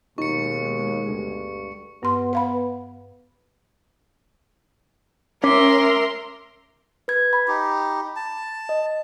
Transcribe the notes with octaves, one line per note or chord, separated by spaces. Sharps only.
D#2 B2 G#3 D#4 C#6 C#7
D2 G2
G2 B3 C6
B4 F5 B5
C#4 A#4 E5 C6 D6 B6
B4 G#6
B5
D#4 G4
A5
D#5